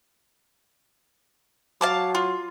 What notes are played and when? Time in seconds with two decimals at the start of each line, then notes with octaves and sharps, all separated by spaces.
1.81 F#3 F5 A5 D6
2.15 F4